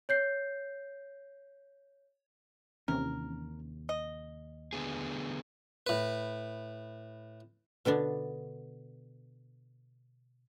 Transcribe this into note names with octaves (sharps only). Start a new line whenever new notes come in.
C#5 G6 C7
D#2 C3 E3 C#4 A#4
D#5
D3 B3 G#4
A2 B4
B2 D3 B3 D4